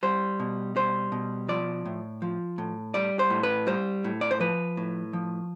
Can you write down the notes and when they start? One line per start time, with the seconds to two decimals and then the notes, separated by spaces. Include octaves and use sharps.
0.03 G3 C5
0.40 B2
0.76 G3 C5
1.12 B2
1.48 F3 D5
1.85 A2
2.22 F3
2.58 A2
2.94 G3 D5
3.19 C5
3.30 A2
3.43 B4
3.67 G3 C5
4.04 A2
4.21 D5
4.31 C5
4.40 F3 B4
4.77 A2
5.13 F3